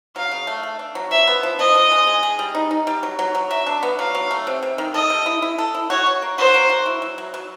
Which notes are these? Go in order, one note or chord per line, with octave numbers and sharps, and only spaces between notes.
F#3 F5
C#3
A3
A3
D4
F#3
F3 E5
B3
F3
F3 D#5
F3
G#3
G#4
G#4
G3
D#4
D#4
G3
F#3
F#3
F#3
F#3 E5
D4
B3
F#3 F5
F#3
A3
C3
C3
D#3
A4 D#5
G3
E4
E4
A4
E4
F#4 C#5
F#4
A#3
F#4 C5
A#3
F#4
E4
F#3
F#3
F#3